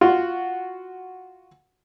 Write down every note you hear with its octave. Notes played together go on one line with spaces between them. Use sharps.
F4 F#4